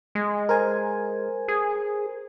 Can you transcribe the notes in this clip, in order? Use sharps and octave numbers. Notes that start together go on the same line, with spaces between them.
G#3
A#4 C5 G#5
G#4